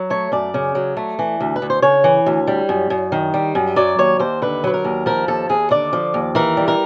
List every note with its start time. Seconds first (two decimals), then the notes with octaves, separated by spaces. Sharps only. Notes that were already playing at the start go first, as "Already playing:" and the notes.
Already playing: F#3
0.10 A3 C#5
0.32 F#2 D5
0.54 C#3
0.75 F#3
0.97 A3
1.19 E3
1.41 D2
1.56 B4
1.62 D2
1.70 C5
1.82 C#3 C#5
2.04 E3
2.26 D2
2.47 G3
2.69 F#2
2.90 F#2
3.12 D#3
3.34 G3
3.55 F#2
3.76 F#3 D5
3.99 D#2 C#5
4.19 D#2 C5
4.42 D3 B4
4.64 F#3 B4
4.74 A#4
4.85 D#2
5.06 F3 A#4
5.28 D#2 A4
5.49 D#2 G#4
5.71 D3 D5
5.93 F3
6.14 D#2
6.35 E3 A#4
6.57 G3
6.68 A#4